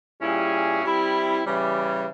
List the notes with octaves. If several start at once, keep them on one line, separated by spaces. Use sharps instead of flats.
A#2 G3 C#4 E4 G#4
G3 C4 E4
C#3 E3 G3